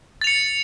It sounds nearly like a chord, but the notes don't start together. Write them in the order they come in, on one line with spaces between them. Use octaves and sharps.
A6 F7 C#7